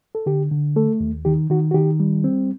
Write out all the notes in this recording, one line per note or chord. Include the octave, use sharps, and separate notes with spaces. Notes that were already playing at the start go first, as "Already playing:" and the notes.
A4
D3 G4
D3
A3 A4
D#2
D#3 G4
D#3 F#4
F#4
D#3 G4
G3
C4